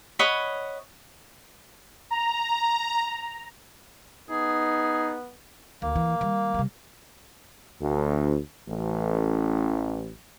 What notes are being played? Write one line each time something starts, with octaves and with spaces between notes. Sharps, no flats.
C#5 D#5 F#5 B5
A#5
B3 D#4 G#4
D2 A#3
E3
D#3 G3
C3 G3
D2
A1